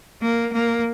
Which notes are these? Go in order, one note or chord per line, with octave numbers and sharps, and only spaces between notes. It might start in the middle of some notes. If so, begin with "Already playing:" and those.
A#3
A#3